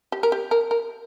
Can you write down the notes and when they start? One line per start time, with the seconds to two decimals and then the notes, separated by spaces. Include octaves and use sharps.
0.12 G4
0.23 A#4
0.32 G4
0.51 A#4
0.71 A#4